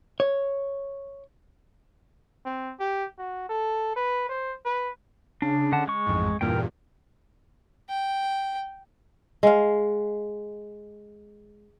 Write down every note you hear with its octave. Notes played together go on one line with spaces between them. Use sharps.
C#5
C4
G4
F#4
A4
B4
C5
B4
C#3 D4
D3 F#5 A5
G#3 C#6
A1 F2 G#2
E2 G2 A#2 A#4 G5
G5
G#3 F5